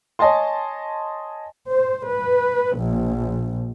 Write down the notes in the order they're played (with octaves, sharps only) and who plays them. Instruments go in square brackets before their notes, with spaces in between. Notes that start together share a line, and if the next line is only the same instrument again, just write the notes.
[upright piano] C#5 D#5 G#5 A5 C6
[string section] C5
B4
A#1